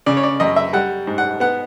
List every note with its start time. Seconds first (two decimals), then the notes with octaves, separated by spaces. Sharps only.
0.06 C#3 D5
0.17 C#5
0.23 D5
0.40 F#2 D#5
0.56 E5
0.73 G3 F#5
1.07 G#2
1.18 F#5
1.40 B3 F#5